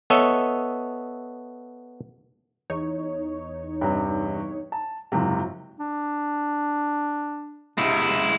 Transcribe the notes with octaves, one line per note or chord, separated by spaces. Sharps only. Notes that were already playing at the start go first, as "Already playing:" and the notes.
B3 A4 C#5 D#5 E5
E2 D#4 C#5
G2 C3
A5
F#1 G#2 C3 F3 F#3
D4
C3 G#3 E4